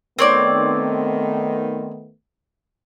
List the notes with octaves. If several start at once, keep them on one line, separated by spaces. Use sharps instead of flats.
D#3 A3 B3 C4 C#5 D5